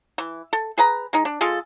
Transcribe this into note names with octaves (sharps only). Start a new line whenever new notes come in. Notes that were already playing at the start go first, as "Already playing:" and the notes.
E3
A4
G#4 B4 A#5
G#3 D#4
D4
G#3 F4 G#4 A4